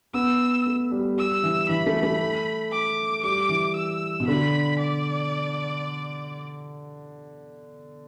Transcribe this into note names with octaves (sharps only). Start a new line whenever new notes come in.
B3 E6
A3
G3
G3 E6
E3
E3 B5
A3
A3
D6
G3 D6
E3
E6
B2
D3 B5
D5